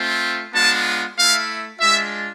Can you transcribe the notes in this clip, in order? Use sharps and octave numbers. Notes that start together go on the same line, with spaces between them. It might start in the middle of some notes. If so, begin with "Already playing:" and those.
Already playing: A3 C4 F4
G#3 B3 D4 F4 A5
A3 E4 F5
G#3 D4 F4 E5